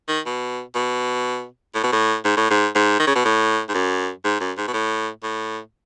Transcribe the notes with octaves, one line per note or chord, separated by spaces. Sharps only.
D#3
B2
B2
A2
B2
A2
G#2
A2
G#2
G#2
D#3
C#3
B2
A2
G#2
F#2
G#2
F#2
G#2
B2
A2
A2